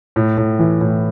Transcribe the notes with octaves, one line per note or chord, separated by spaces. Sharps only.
A2
A2
E3
A2